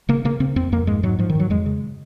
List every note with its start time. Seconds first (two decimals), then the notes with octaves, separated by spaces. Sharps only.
0.09 C#3 A#3
0.25 C#3 A#3
0.40 C#3 C4
0.56 F2 C4
0.72 F2 A#3
0.87 G#2 G#3
1.03 G#2 F#3
1.19 G#2 F3
1.30 D#3
1.35 G#2 F#3
1.50 F2 G#3
1.66 C#3